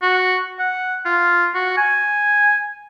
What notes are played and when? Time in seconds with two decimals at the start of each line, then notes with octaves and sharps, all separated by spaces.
0.02 F#4
0.59 F#5
1.05 F4
1.55 F#4
1.77 G#5